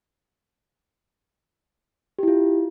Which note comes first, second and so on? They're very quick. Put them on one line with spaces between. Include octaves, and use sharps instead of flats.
G4 E4 F4